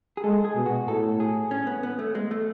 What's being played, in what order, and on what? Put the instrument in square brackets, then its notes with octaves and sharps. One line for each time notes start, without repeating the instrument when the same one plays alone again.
[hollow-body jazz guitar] G#4
[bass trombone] G#3 [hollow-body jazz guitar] A4
[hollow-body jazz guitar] G#4
[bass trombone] B2
[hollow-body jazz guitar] F#4
[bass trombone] A2 [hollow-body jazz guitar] A4
[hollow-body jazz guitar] G#4
C#4
B3
B3
A3
G#3
A3